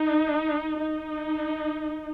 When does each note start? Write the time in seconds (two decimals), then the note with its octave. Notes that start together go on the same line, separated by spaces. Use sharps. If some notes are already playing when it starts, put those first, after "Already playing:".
Already playing: D#4
0.81 D#4